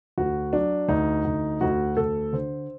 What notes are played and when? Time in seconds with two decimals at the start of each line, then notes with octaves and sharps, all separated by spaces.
0.18 D2 F#4
0.53 F#3 D4
0.88 D2 D#4
1.24 D2
1.61 D2 F#4
1.97 D2 A4
2.33 D3 C5